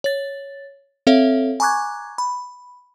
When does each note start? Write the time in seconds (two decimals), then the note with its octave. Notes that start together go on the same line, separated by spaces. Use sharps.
0.04 C#5 A6
1.07 C4 A4 C#5 E5 F5
1.60 G#5 A#5 C#6 D6 F#6 G#6
2.18 B5